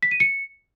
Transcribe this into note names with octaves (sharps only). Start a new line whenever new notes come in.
B6
D#7
C#7